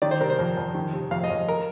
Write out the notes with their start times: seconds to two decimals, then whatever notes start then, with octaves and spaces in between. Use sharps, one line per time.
0.02 D#3 D5
0.11 C5
0.21 C3 A#4
0.30 C5
0.39 F2
0.57 F2
0.75 D#3
0.93 C3
1.11 F2 F5
1.24 D#5
1.30 F2
1.48 A#4